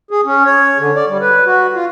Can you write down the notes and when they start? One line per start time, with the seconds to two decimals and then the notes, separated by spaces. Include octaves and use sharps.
0.11 G#4
0.25 C#4
0.45 C#5
0.79 D3
0.96 D5
1.08 G3
1.21 B4
1.46 F#4
1.75 F4